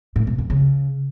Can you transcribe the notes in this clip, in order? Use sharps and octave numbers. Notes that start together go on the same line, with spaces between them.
A2
B2
F2
C#3